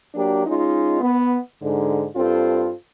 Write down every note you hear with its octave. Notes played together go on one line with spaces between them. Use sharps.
F#3 A#3 D4 G4
G#3 C#4 D#4 F4
B3
G#2 D3
G2 C4 F4 A4